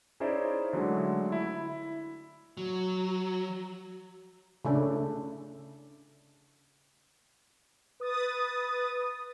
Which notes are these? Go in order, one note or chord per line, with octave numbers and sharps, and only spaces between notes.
C#4 D#4 E4 G#4 C5 D5
D3 F#3 G#3 A3
E4
F#3
C#3 A3 D4
B4 D#6 A6